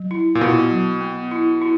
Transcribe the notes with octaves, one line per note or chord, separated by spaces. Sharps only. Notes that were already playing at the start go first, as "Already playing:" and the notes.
Already playing: F#3
E4
A#2
B2 E4
F#3
B3
E4
E4